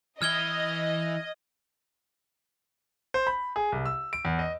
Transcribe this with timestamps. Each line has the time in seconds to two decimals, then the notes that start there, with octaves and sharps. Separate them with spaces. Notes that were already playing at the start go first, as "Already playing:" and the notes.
0.22 E3 D#5 E5 F6 G#6 G7
3.14 C5
3.27 B5
3.56 G#4
3.72 C2
3.86 E6
4.13 D7
4.25 E2
4.39 D#5